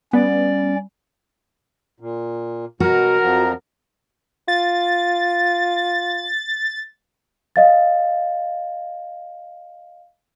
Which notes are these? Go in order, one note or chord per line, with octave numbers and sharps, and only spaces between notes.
G3 B3 C#4 D5
A#2
B2 F#3 F#4 A#4
F2 F3 A#5
F4 A6
D#5 F5 A6